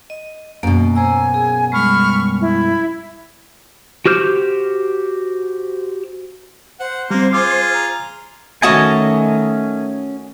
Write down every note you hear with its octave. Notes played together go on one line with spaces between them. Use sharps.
D#5
F#2 B2 A#3
C5 G#5 A#5 E6
G#4
G3 G#3 B5 C#6 F6
E4
F#4 G4 C5 F6 G6
C5 F#5
G3 A#3 C4
F4 G#4 D6
A#5
D#3 A3 C#4 F#4 D#5 G#5 A5